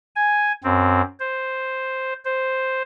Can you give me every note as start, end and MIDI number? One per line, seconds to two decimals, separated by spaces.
0.16 0.52 80
0.64 1.02 42
0.64 1.02 60
1.20 2.13 72
2.25 2.82 72